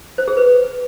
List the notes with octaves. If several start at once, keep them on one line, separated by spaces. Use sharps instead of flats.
C5
G#4
B4